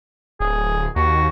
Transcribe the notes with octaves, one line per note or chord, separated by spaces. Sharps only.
D1 G#4
D#2 F#4